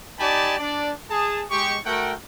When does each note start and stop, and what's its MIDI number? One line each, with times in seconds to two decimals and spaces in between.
0.20 0.58 63
0.20 0.58 67
0.20 0.58 74
0.20 0.58 80
0.20 0.58 81
0.20 0.58 83
0.59 0.92 62
0.59 0.92 74
1.11 1.44 68
1.11 1.44 81
1.51 1.78 56
1.51 1.78 67
1.51 1.78 85
1.86 2.13 57
1.86 2.13 66
1.86 2.13 70
1.86 2.13 78
1.86 2.13 79